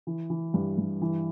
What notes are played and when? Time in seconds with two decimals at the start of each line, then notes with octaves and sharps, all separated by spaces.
0.07 E3
0.30 E3
0.54 G2
0.78 G2
1.02 E3